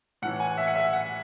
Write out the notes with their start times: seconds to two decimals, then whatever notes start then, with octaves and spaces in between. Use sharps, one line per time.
0.22 A2 E3 F#5
0.40 G#5
0.57 E5
0.67 F#5
0.75 E5
0.93 F#5